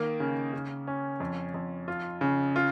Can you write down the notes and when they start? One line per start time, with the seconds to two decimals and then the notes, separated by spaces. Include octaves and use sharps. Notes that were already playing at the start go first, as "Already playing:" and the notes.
Already playing: D#3 A#3
0.20 C#3
0.53 C#3
0.87 C#4
1.20 F2
1.54 F2
1.88 F4
2.21 C#3
2.56 F4